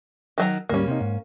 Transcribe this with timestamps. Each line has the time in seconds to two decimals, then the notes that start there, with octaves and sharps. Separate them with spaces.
0.38 D#3 F#3 A#5
0.69 D2 G#2 G3 A#3 C#4
0.88 C3 D#4
1.00 G#2